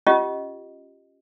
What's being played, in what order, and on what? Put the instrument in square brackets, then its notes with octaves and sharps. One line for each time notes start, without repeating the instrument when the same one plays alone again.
[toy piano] C#4 F4 G4 D#5